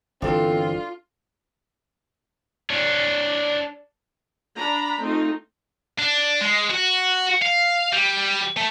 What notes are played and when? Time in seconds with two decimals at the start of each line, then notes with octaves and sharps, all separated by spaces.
0.22 G1 E3 C4 D4 F4 A4
2.70 D4 C#5
4.55 D4 A#5 B5
5.00 A3 C4 D#4 F4
5.99 D4
6.41 G#3
6.70 F#4
7.42 F5
7.92 G3
8.57 A3